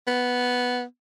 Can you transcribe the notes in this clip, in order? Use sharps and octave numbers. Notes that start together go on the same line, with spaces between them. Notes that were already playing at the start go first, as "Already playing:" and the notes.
B3